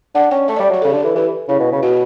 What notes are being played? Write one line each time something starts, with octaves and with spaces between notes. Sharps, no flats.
D4 F#5
C#4 G5
A3 E5
G3 D5
C#5
F#3 D5
C#3 A4
D3 G4
A4
E3
E3 G4
C#3 E4
B2
C#3
B2 F#4